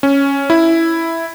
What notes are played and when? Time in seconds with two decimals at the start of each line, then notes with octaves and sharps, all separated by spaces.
0.03 C#4
0.50 E4